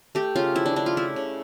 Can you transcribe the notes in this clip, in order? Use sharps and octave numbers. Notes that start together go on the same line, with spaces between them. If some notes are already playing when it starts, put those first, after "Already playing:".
A3 G4
C#3 F4
F3 E4
D4
C#3 D4
F4
A3 E4
C#3